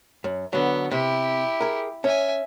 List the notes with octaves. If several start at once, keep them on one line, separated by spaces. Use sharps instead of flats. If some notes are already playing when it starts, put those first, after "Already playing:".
F#2
D3 F#3 B3
C3 E4 G4
G#4 A#4
C#4 E5 G#5